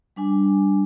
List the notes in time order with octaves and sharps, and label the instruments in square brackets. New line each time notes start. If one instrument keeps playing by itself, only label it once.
[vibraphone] G3 D4 G#5